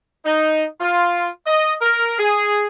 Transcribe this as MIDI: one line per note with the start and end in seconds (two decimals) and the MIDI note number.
0.26 0.64 63
0.81 1.29 65
1.47 1.73 75
1.82 2.19 70
2.19 2.66 68